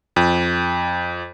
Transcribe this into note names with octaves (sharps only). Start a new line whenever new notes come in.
F2